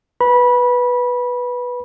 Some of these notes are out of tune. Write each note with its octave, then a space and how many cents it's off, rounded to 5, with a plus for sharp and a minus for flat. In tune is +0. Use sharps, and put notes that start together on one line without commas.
B4 -5 B5 -20